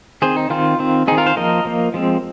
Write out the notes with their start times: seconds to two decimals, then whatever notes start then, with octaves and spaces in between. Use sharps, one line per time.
0.22 D#3 C4 G#4 C5
0.36 D#4
0.50 D#3 C4 F4
0.79 D#3 C4
1.08 D#3 C4 D#4 G#4
1.18 F4 A#4
1.27 C5 F5
1.36 F3 A#3 A#4 D#5
1.65 F3 A#3
1.94 F3 G#3 C4